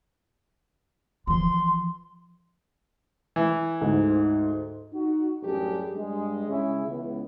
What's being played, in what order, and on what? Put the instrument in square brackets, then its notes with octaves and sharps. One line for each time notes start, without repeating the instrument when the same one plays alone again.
[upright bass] E3 F3 [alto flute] C6
[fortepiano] E3
[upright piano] D2 G#2
[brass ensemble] D#4 F#4
A1 F#2 G3 D4 G4 G#4
G2 G#3
C#3 G#3 C#4 E4 G#4 E5
C#2 E3 B3